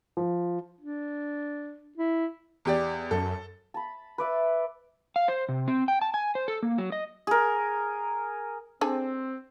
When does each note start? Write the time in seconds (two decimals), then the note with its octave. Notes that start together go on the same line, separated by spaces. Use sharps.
0.17 F3
0.81 D4
1.98 E4
2.65 E2 G4 D5
3.11 F#2 A4
3.74 A5 B5
4.18 B4 D5 E5
5.16 F5
5.28 C5
5.49 C3
5.68 C4
5.88 G5
6.01 A5
6.14 G#5
6.35 C5
6.48 A4
6.63 A#3
6.78 F#3
6.92 D#5
7.27 G#4 A#4
8.81 C4 D4 G#4 A4